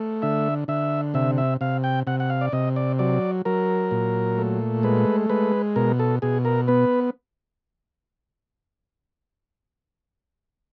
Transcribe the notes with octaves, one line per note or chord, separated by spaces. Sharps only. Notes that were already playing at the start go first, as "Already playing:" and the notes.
Already playing: A3
D3 E5
D3 E5
C3 E5
E5
C3 F5
G5
C3 F#5
F#5
F5
D5
C3 D#5
D5
F#3 D5
F#3 A#4
A#2
A3
G#3 B4
G#3 B4
B2 A#4
A4
B2 G#4
A#4
B3 B4